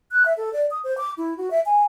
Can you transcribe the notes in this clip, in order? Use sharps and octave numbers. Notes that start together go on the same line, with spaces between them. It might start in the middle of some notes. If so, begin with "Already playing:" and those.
F#6
E5
A4
D5
D#6
C5
D6
E4
F#4
E5
G#5